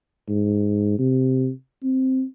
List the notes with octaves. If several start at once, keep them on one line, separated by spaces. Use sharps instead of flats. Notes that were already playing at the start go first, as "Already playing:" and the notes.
G#2
C3
C4